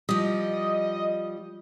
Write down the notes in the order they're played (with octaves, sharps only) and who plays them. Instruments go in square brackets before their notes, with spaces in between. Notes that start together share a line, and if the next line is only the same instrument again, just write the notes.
[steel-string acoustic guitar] F3 G3 [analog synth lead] D#5